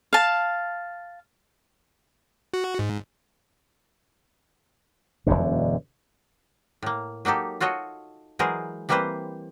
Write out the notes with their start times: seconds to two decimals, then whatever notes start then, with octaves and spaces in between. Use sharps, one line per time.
0.13 F5 A5
2.54 F#4
2.79 G#2
5.27 E1 B1 F#2 D3
6.83 A2 A#3
7.25 F#3 A#3 D#4 G4 A4
7.60 F4 F#4 A4 C#5 D#5
8.39 E3 F#3 G#3 G#4 A#4 C5
8.89 E3 G3 A#3 C4 B4 C5